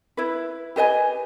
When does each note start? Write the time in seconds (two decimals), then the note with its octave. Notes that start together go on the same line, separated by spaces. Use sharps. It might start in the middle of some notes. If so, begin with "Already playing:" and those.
0.17 E4 B4
0.76 G4 B4 D#5 G#5